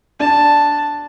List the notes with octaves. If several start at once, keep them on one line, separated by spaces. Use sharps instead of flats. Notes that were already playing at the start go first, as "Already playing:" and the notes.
D4 A5